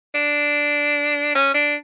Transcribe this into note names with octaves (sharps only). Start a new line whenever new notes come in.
D4
C#4
D4